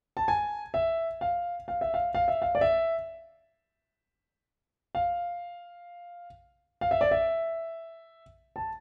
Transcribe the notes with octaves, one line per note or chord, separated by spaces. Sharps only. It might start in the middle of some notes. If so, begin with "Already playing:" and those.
A5
G#5
E5
F5
F5
E5
F5
F5
E5
F5
D5
E5
F5
F5
E5
D5
E5
A5